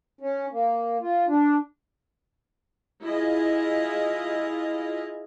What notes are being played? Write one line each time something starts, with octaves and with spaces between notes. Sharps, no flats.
C#4
A#3
F4
D4
E4 F4 G#4 D#5